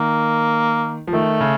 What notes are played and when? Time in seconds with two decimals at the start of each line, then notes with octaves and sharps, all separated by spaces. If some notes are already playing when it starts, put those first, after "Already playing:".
Already playing: D#3 A#3
1.07 F3
1.13 D#3 A3
1.40 C#3